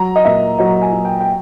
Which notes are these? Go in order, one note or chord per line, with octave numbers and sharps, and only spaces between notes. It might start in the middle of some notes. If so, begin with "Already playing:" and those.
Already playing: F#3 A#5
D#5
A#2 E5
F#3 D#5
G#5
F#3
G5
G5